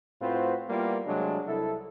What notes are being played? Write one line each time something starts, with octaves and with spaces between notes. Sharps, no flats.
A2 C4 F4 F#4 B4 C5
G3 A#3 B3 E4 F4
C3 F#3 G#3 A3 D4
C2 E4 A4